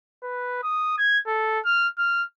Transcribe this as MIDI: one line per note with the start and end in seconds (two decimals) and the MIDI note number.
0.23 0.60 71
0.63 0.96 87
0.98 1.19 92
1.27 1.60 69
1.65 1.88 89
1.98 2.24 89